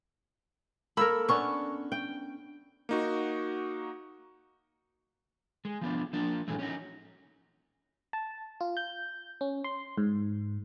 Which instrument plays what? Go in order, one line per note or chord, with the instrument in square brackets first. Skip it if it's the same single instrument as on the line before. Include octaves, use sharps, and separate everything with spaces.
[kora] A#3 A4 A#4 [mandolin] B5 E6
[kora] B3 C#4 D4 [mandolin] C#6
[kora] G5
[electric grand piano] A#3 D#4 F#4
[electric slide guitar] G#3
F3 B3 D4
F3 A#3 D4
A2 E3 F#3 G#3 A3
C#4 D#4 F#4
[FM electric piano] A5
F4
G6
C#4
C6
G#2